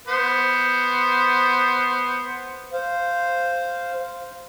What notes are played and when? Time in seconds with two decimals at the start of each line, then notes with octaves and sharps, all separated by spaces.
0.07 B3 C5
2.72 C5 F5